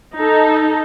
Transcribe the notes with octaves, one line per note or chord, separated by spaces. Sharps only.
D#4 A4